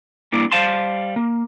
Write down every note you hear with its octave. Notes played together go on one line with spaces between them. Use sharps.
G3 A#3 D4 E4
G3 C5 F5 A5 C6
A#3